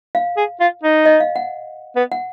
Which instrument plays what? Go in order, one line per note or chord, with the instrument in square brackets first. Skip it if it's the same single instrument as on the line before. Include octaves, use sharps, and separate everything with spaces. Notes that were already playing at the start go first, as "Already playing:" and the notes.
[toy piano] F5
[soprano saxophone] G#4
F4
D#4
[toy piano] D#5
F5
F#5
[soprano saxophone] B3
[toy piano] F#5